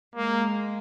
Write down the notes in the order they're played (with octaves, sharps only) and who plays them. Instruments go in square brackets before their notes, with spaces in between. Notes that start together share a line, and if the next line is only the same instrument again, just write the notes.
[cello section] G#3 [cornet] A#3